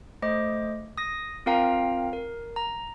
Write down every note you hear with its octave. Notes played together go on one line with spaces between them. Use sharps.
A3 C5 D#5 D6
D#6 A#6
C4 F4 A#4 F5 G5 A#5
A#4
A#5